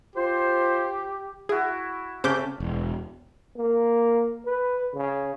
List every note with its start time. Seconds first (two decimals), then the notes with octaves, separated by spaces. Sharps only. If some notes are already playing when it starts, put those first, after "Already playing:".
0.16 F4 G4 C5
1.49 E4 F#4 G#4
2.24 C#3 A3 C4 C#4 D6 G6
2.60 E1
3.56 A#3
4.46 B4
4.95 C#3